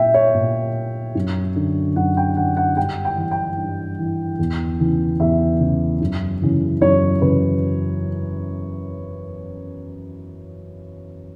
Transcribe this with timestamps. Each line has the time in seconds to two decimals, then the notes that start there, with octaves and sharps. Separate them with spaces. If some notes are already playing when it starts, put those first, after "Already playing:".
Already playing: A#2 E5 G5
0.14 C#5
0.35 A#2
1.15 F#2
1.56 D3
1.96 F#2 F#5
2.17 G5
2.37 D3 F#5
2.57 F#5
2.77 G2 G5
3.05 G5
3.17 E3
3.31 G5
3.58 G2
3.99 E3
4.39 E2
4.80 C#3 E3
5.20 E2 E5
5.60 C#3 E3
6.01 F#2
6.41 C#3 E3
6.82 F#2 C#5
7.21 C#3 E3 B4